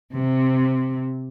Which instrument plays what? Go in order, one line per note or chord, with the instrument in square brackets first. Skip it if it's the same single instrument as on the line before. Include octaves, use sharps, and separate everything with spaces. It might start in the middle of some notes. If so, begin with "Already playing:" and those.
[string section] C3